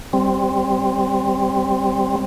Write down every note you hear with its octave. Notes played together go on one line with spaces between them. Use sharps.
G3 C4